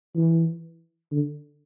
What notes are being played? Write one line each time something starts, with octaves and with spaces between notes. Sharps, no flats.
E3
D3